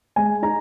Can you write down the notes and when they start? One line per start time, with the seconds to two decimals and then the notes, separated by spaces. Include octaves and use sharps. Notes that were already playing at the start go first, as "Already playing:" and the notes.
0.16 G#3 G#5
0.42 D#4 A#5